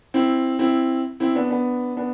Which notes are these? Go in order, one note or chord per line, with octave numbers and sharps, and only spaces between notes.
C4 E4
C4 E4
C4 E4
B3 D4
B3 D4
B3 D4